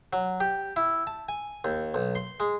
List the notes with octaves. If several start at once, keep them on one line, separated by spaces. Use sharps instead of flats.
F#3
G4
E4
A5
G#5
D#2
B1
C6
G#3